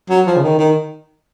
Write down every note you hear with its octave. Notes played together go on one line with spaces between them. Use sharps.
F#3
F3
C#3
D#3
D#3